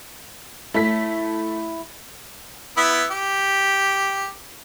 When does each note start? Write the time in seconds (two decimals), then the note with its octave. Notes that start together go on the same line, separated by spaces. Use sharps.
0.74 A3 E4 B6
2.77 B3 E4 E5
3.11 G4